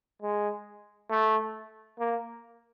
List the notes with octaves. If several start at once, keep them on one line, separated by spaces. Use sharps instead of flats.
G#3
A3
A#3